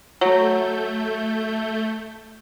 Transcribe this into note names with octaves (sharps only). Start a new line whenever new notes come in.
F#3 A3 G6